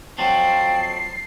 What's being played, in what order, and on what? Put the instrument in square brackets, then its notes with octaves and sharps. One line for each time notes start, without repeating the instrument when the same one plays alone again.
[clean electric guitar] F2 F3 F#3 [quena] G5 [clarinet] A5 [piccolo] C7